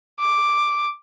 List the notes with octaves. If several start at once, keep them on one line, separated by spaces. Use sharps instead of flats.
D6